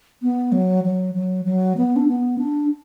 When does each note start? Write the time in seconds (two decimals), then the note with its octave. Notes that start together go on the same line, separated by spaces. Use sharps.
0.22 B3
0.52 F#3
0.84 F#3
1.14 F#3
1.45 F#3
1.77 B3
1.96 D4
2.08 B3
2.38 D4